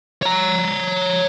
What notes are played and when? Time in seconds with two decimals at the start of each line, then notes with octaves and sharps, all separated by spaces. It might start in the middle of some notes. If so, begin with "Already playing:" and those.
0.23 C#5 A#5